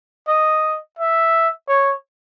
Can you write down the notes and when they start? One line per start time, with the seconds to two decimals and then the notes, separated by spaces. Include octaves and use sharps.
0.28 D#5
0.99 E5
1.69 C#5